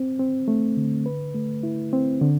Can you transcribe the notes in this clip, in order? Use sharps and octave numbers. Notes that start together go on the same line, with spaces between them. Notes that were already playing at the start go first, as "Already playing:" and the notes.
Already playing: C4
C4
A3
D3
B4
A3
E4
C4
D3